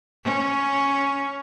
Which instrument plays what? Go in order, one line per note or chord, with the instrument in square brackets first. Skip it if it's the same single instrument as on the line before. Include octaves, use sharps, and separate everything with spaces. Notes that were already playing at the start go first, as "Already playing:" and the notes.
[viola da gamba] C#4